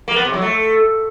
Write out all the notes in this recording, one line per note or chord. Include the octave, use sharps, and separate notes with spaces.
A#3
B3
C3
F#3
A3